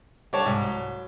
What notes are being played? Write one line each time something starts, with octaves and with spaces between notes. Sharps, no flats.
D3 G3 D4 C#5 A5
C2 G#2
F#3